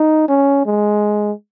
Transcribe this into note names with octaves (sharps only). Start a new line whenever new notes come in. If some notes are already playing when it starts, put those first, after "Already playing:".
Already playing: D#4
C#4
G#3